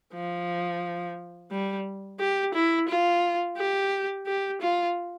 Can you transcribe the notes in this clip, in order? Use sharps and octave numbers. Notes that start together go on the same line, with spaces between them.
F3
G3
G4
E4
F4
G4
G4
F4